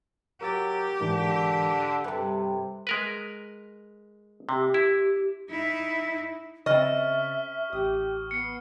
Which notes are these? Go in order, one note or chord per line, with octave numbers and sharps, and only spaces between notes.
F#3 G4 A#4 E6 A6
G#2 D3 E3 A#4
G2 C3 G3 A4 B4 F#6
G#3 A#4 B4
C3 G4
E4
D#4 E4
C#3 C4 D#5 E5 C#6 F6 A6
A1 G4 D#6
B3 C7 C#7